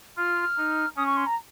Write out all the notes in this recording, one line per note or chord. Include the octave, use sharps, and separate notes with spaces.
F4 F6
D#4
C#4 D#6
C#6
C6
A#5